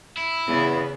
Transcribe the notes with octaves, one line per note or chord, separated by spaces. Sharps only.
E4
E2 C#3 B3